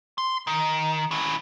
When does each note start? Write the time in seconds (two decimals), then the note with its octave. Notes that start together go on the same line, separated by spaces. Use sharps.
0.18 C6
0.47 D#3
1.11 C#4 E4